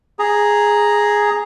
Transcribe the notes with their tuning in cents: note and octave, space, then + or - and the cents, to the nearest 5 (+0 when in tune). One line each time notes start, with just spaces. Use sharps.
G#4 +0 A#5 +0